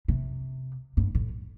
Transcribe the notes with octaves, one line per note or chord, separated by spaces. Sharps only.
C3
G2
A2